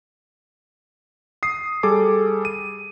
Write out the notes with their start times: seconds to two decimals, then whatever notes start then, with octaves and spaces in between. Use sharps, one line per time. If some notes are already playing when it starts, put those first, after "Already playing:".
1.43 D#6 C7
1.83 G3 G#4 A4 D6
2.45 D#7